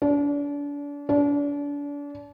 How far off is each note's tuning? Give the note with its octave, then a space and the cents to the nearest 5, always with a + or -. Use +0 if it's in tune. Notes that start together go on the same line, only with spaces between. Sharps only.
D4 -35
D4 -35